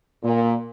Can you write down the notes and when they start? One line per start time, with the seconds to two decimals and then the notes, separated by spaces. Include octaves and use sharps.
0.23 A#2